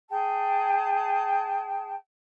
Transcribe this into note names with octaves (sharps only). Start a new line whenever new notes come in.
G#4 G5 A5